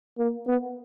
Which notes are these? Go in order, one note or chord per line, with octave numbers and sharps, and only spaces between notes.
A#3
B3